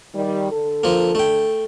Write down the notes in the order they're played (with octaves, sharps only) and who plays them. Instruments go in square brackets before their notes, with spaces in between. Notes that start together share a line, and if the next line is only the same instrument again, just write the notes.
[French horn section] D#3 G3
D3 A4
[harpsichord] F3 A#3
A3 G5